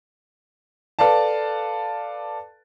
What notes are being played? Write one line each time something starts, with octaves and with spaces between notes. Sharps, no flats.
A4 B4 D5 F5 A5